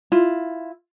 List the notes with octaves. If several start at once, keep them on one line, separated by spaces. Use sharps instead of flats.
E4 F4